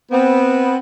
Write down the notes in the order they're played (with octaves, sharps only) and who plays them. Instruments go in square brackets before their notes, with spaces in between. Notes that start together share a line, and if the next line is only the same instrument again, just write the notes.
[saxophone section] B3 C4